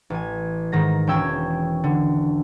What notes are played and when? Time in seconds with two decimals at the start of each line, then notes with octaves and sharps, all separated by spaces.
0.10 A1 G#5
0.72 G#2 D#3 A#6
1.07 E1 C#4 G5 E6 G#6
1.84 D3